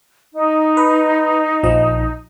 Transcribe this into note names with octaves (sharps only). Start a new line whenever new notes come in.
D#4
B4
A#1 F3 D#5